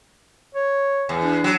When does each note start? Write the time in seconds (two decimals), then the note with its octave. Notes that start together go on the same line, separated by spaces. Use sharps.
0.55 C#5
1.09 E2
1.23 D4
1.44 F#3